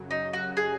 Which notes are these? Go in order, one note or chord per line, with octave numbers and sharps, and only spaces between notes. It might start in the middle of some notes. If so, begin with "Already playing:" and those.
Already playing: F#2 C#3 F#3
D#4
F#4
G#4